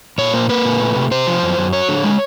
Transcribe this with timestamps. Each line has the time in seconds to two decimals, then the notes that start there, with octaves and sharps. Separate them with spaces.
0.18 A#2 C#5
0.33 A#3 C5
0.49 A#3 B4
0.65 A#2
0.80 A3
0.96 C3
1.11 C3 C5
1.27 F3
1.42 F#2
1.58 F#2
1.73 F#3 C#5
1.89 D3
2.04 G#3